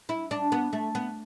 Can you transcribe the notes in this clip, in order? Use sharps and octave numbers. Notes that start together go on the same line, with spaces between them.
E4
D4
B3
A3
B3